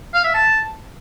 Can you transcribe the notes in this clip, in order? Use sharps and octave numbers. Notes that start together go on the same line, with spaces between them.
F5
E5
A5